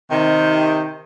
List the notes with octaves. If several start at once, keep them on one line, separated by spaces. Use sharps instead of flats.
C3 D#3